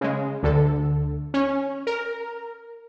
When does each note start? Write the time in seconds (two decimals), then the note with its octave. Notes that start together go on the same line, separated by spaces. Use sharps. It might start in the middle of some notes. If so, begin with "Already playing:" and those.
0.01 C#3 G#3
0.43 D2 D3 A4
1.34 C#4
1.87 A#4